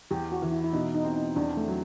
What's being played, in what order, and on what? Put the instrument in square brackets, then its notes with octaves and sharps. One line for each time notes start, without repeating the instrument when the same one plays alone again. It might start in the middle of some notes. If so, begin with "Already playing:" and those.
[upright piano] E2 [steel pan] G4
[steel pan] F#4
[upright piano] E3
[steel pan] E4
E4
[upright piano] B2 [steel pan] D#4
[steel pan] D#4
[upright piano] C4
[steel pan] D#4
[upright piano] E2 [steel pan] D4
[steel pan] A3
[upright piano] F#3